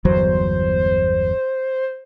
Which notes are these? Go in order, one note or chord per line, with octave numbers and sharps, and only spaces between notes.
G1 E2 F#3 C5